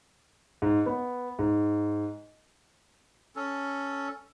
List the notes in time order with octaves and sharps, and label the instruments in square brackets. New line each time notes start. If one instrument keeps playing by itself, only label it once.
[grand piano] G#2
B3
G#2
[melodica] C#4 A4